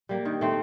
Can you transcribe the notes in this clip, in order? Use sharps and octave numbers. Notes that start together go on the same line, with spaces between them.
G3 A#3
D#3
A3 C4